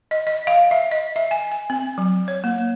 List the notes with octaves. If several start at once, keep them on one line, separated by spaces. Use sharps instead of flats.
D#5
D#5
F5
E5
D#5
E5
G#5
G#5
C4
F#3
C#5
A#3